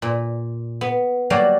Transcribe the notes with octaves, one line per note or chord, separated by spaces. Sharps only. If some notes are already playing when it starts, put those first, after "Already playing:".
A#2
B3
F#3 G3 A#3 F#4 D5